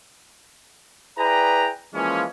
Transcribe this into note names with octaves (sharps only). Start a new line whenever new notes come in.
E4 G#4 B4 D5 G5 A#5
E3 F3 G#3 A#3 C#4